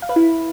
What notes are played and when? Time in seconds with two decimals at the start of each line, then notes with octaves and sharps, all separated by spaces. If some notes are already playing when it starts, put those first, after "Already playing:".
0.02 F5
0.09 B4
0.16 E4